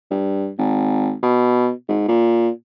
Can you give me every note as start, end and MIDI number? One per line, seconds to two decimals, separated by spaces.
0.11 0.49 43
0.59 1.14 32
1.23 1.71 47
1.89 2.08 44
2.09 2.49 46